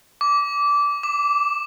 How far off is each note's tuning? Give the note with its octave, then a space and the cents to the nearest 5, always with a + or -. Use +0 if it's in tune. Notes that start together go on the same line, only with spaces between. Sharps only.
D6 -20
D6 +10